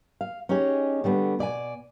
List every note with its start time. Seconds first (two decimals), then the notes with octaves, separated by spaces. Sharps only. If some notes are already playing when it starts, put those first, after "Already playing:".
0.21 F5
0.49 C#4 D#4 G4 G#4 C#5
1.04 D3 G3 A3 B3
1.39 B2 D5 E5 G#5